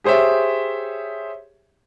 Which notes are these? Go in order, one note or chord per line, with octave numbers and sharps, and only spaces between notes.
G4 G#4 C5 C#5 E5